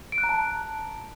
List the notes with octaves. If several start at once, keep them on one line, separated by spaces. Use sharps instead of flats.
D7
F#6
A#5
A5